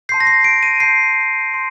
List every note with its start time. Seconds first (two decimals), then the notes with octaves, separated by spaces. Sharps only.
0.09 G6 C7
0.12 A5 C6
0.20 A#6
0.27 C7
0.44 D7
0.63 D#7
0.80 A5 C6 G6 C7
1.52 C6 G6